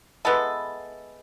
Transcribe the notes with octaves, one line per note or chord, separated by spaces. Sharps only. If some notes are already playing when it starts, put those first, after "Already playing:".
G#3 B3 E4 A4